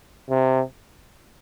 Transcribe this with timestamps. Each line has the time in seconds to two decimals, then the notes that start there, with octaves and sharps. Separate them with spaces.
0.30 C3